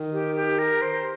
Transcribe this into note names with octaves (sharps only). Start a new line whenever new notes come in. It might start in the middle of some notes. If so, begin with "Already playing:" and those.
Already playing: D#3
G4
G4
A#4
C5